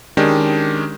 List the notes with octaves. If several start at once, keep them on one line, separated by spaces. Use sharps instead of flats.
D#3 G#3 C#4 D4 G4 G#4